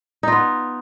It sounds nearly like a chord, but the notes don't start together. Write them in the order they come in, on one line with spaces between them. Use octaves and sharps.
D#4 F4 B3